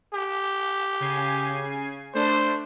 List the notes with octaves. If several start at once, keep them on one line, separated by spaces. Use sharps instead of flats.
G4
C#3 G#5 C7
A3 D4 C5